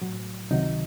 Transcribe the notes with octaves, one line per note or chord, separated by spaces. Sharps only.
A2 F#3
C#2 C3 D#3 F#3 D#4